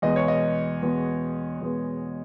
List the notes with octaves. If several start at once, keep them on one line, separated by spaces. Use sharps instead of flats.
E2 B2 G#3 B3 D#5
C#5
D#5
E2 B2 G#3 B3
E2 B2 G#3 B3